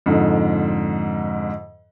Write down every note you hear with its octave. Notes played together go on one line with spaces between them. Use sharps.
F2 G#2 D3